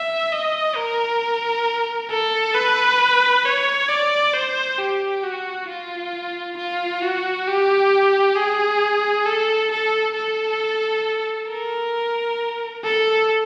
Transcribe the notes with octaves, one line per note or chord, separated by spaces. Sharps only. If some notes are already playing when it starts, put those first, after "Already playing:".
Already playing: E5
D#5
A#4
A4
B4
C#5
D5
C5
G4
F#4
F4
F4
F#4
G4
G#4
A4
A4
A4
A#4
A4